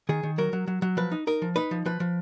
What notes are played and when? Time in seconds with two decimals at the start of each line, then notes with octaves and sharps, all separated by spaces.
0.09 D#3 G#4
0.23 D#3
0.38 F#3 A#4
0.53 F#3
0.67 F#3
0.82 F#3
0.97 F3 B4
1.12 D#4
1.27 D#4 A#4
1.42 F3
1.56 D#4 B4
1.71 F3
1.85 F3 B4
2.00 F3